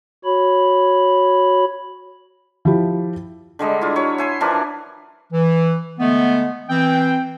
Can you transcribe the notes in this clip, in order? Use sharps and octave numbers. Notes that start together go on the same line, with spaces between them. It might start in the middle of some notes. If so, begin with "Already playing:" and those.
F#4 C#5 B5
F3 E4 G4
D3 G3 G#3 D#5
E4 F4
F#3 C#5
E5 G#5 C6
E3 F3 D4 A#4
E3
D3 G#3 A3 B3
E3 C4 G5